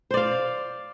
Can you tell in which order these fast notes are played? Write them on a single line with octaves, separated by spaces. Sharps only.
C5 D5 F5